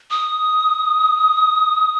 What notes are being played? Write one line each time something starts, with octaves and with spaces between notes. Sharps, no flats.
D#6